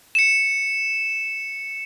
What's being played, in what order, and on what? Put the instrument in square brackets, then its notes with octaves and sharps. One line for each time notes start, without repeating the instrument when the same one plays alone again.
[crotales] C#7 E7